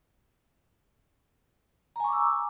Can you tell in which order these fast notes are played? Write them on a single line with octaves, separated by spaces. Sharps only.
A#5 G#5 C#6 D6 E6